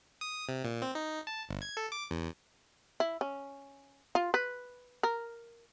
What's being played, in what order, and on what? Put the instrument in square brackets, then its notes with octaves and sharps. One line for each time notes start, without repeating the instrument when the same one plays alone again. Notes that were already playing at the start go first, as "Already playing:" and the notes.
[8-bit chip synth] D#6
C3
A#2
C4
D#4
A5
G1
G#6
A4
D6
E2
[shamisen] E4
C#4
F4
B4
A#4